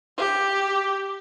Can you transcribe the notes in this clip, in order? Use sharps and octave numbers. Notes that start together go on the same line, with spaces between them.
G4